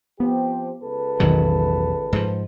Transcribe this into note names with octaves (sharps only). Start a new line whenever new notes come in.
F3 B3 C4 G4
C#2 A4 B4
A1 E2 B2 D#3 F#3
G#2 F3